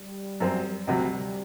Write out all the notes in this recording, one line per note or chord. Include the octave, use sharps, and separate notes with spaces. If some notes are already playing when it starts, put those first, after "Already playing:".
Already playing: G3
F#2 F#3 C4
D2 C3 F#3 G3